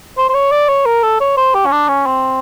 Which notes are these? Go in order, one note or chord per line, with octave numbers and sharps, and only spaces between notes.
C5
C5
C#5
D5
C#5
A#4
A4
C#5
C5
G4
C#4
D4
C#4
C4